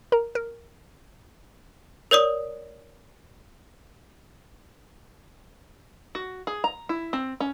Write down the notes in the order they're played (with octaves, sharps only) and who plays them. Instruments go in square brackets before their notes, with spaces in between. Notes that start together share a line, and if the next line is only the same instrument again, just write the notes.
[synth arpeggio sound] A#4 A#5
A#4
[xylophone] A#4 C#5 D5 D#6
[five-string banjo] F#4
G#4
A#5
E4
C4
C#4